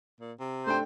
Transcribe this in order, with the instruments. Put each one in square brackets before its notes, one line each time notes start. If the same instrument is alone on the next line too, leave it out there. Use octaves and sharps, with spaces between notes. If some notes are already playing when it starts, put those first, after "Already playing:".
[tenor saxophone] A#2
C3
[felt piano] A3 D4 G5 [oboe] C5